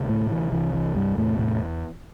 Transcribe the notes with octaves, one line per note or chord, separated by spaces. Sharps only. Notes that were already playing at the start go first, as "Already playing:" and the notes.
Already playing: D2 C3
A2 A3
E3
C2 C3 E3
E3
G2 G3
E2 A2 C3 A3
A2 A3